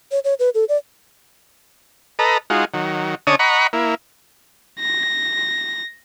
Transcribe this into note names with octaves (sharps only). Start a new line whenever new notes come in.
C#5
C#5
B4
A4
D5
A4 B4 D#5 A#5
G#3 D#4 F4 F#4
D#3 F#3
D3 C#4 C#5 D#5 A5 D#6
D#5 F#5 A#5 B5 C#6
A#3 E4
A#6